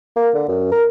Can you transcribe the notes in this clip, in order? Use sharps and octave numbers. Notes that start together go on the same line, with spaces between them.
A#3
D3
F#2
A#4